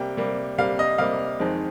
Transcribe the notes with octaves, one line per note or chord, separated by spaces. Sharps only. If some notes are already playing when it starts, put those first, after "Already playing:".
Already playing: C3 G3 A#3 G5
C3 G3 A#3
C3 G3 A#3 F5
D#5
C3 G3 A#3 F5
F2 D#3 G#3 C4